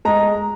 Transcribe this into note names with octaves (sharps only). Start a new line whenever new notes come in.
G#3 A#5